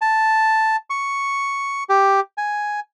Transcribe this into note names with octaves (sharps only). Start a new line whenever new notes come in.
A5
C#6
G4
G#5